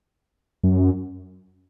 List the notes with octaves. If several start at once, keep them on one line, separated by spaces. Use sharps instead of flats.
F#2